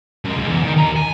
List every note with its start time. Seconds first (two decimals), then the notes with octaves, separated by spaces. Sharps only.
0.24 F#2 G#3
0.36 C#2
0.48 E2
0.63 D#3
0.76 D#2 A#5
0.96 G#5